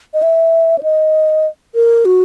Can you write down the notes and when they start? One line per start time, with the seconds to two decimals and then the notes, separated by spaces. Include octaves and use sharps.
0.14 D#5
0.23 E5
0.78 C#5
0.83 D#5
1.75 A#4
2.05 F#4